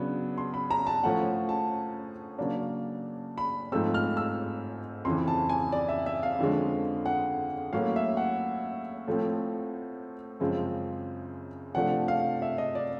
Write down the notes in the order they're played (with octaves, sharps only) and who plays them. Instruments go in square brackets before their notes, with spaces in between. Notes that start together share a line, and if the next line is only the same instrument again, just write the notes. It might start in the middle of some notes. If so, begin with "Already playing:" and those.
Already playing: [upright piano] C#3 F#3 B3 D4
C6
B5
A#5
A5
A2 F3 A3 C#4 F#5
A5
C#3 F#3 A#3 D4
B5
G#2 F3 A3 C4 E6
F6
E6
F2 C#3 E3 C6
A5
G#5
D5
E5
E5
F5
F2 D3 F3 G#3 C#4
F#5
A2 F#3 A#3 C#4 F5
E5
F#5
A2 F3 A3 C4
F#2 C#3 F3 G#3 C4
C3 F3 A3 D4 F#5
F5
E5
D#5
D5